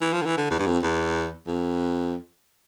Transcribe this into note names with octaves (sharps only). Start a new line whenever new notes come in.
E3
F3
D3
E3
D3
E2
G2
F2
E2
F2